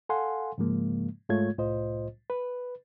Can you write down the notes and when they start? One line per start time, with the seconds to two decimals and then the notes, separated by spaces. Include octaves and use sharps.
0.09 A4 F5 F#5 G#5 C6
0.58 G#2 C#3 F3 G#3 A#3
1.29 G#2 G#3 A3 F4 C#5 G#6
1.58 C2 A2 F4 C5 D#5
2.30 B4